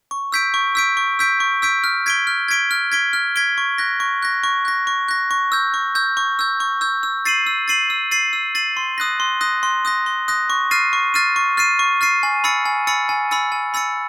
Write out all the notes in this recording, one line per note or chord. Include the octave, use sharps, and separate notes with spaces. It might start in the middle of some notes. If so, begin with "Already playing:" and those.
C#6
E6 G6 B6 D7
C#6
E6 G6 B6 D7
C#6
E6 G6 B6 D7
C#6
E6 G6 B6 D7
F6
G#6 B6 D7 G7
F6
G#6 B6 D7 G7
F6
G#6 B6 D7 G7
F6
G#6 B6 D7 G7
C#6
F#6 A#6
C#6
F#6 A#6
C#6
F#6 A#6
C#6
F#6 A#6
C#6
E6 G6
C#6
E6 G6
C#6
E6 G6
C#6
E6 G6
E6
A6 C7 D#7 F#7
E6
A6 C7 D#7 F#7
E6
A6 C7 D#7 F#7
E6
A6 C7 D#7 F#7
C6
D#6 F#6 A#6
C6
D#6 F#6 A#6
C6
D#6 F#6 A#6
C6
D#6 F#6 A#6
C#6
F6 A6 C7 D#7
C#6
F6 A6 C7 D#7
C#6
F6 A6 C7 D#7
C#6
F6 A6 C7 D#7
G#5
B5 E6 A6 C#7
G#5
B5 E6 A6 C#7
G#5
B5 E6 A6 C#7
G#5
B5 E6 A6 C#7